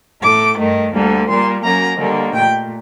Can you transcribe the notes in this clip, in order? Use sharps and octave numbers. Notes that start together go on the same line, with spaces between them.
A2 A3 D6
G2 D#3 A3
D2 D3 G3 A#3
A#2 G3 A#3 C6
F#2 F#3 A#3 A#5
D#2 D3 G3 A#3
A#2 A3 G5